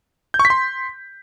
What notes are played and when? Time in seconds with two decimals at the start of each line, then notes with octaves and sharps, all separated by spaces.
0.34 G6
0.39 C#6
0.45 B6
0.50 C6